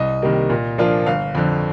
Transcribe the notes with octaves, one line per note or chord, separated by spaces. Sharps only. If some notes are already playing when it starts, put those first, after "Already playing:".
Already playing: C2 D#5
C3 D#3 G3 A#3
A#2
F3 A#3 D4 F4
G1 F5
F2 D3